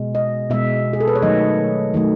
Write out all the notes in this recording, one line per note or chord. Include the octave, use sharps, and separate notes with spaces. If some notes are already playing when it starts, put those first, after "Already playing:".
Already playing: B2 G#3
D#5
B2 G#3 E5
G#4
A4
B4
C#5
D#3 F#3 A3 D#5
D#3 F#3 A3